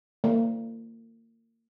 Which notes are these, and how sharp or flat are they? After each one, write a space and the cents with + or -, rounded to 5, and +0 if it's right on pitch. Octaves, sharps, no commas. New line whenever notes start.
A#3 -35